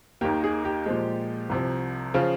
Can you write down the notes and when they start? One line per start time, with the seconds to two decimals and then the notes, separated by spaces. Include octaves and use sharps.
0.21 D#2 D#3 A#3 G4
0.44 G#4
0.65 G4
0.86 A#2 F3 G#3
1.49 C2 C3 F3
2.14 C#3 F3 F4